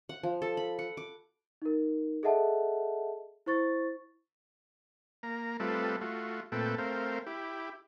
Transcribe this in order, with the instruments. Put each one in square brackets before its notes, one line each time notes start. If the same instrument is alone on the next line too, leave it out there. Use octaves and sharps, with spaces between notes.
[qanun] F#5
F3
A4
B5
F#5
D6
[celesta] D#4 A#4
G#4 A4 D#5 E5 F#5 A5
E4 C5 C#6 A6
[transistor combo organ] A#3 A#5
G3 A3 C4 F4 A4 B4
A3 F4 F#4
A#2 A3 C4 A4 B4 G5
A3 C4 A#4 C5 F5
E4 G4